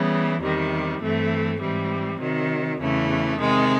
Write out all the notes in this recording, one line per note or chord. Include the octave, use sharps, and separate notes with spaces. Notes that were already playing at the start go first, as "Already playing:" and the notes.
Already playing: C#3 E3 G3 B3
E2 C3 D#3 G3
G2 E3 A3 C4
G#2 E3 G3 C4
C3 D#3 F#3
E2 C#3 E3 A3
C3 D#3 G#3